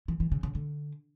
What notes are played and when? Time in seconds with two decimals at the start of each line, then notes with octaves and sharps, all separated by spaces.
0.08 E3
0.20 E3
0.32 C#3
0.43 C#3
0.55 D3